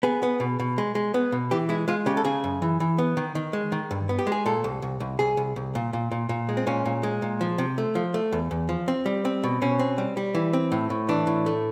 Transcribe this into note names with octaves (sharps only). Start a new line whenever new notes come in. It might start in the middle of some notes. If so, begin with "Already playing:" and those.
B3 G#4
B3
B2
B2
G#3
G#3
B3
B2
E3 G4
G#3 E4
G#3 F4
C#3 G4
A4
C#3 G#4
F#2
E3
E3
B3
D#3
D#3
G#3
D#3
G2
B3
G4
G#3
G#4
A#2 A4
C2
C2
C2
C2 G#4
C2
C2
A#2
A#2
A#2
A#2
G#3
C4
A#2 C#4
A#2
G#3
A#2
F3
C3
A3
F3
A3
E2
E2
F3
C4
G3
C4
B2
B2 C#4
C4
G3
G3
E3
C4
A2
A2
E3 D4
A2
A3